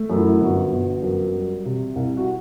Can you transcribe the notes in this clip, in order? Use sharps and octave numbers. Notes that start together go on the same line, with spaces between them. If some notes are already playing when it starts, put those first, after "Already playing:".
Already playing: A3
F#2
E4
G1 F#4
G1
F#2
G3
C3
C2
F#4